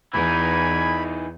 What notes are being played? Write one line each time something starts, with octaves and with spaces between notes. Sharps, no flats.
E2 E3 D#4 G#5 B5